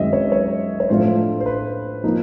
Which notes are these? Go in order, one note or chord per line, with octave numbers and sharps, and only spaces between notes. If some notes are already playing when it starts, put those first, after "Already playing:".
Already playing: F#2 D#3 G#3 C4 D#5 E5
C#5
C#5
C#5
A2 F3 A3 D4 F4 C5
C5
B4
F3 A#3 D#4